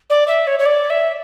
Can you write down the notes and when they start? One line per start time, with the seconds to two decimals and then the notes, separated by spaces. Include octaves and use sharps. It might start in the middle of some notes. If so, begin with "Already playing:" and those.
0.10 D5
0.28 E5
0.47 C#5
0.59 C#5
0.66 D5
0.90 E5